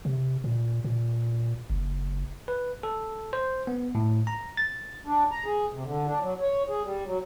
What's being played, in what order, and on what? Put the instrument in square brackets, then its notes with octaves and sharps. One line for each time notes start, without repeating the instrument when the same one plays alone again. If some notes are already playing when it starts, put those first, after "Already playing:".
[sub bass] C3
A#2
A#2
F#1
[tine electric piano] B4
A4
C5
B3
A2
A#5
A6
[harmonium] D4
A#5
G#4
C3
D3
D4
F#3
C#5
G#4
G3
F#3